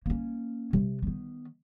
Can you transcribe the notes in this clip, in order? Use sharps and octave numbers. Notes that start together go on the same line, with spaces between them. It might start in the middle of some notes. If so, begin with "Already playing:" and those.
A#3 C#4
C3
D#3 B3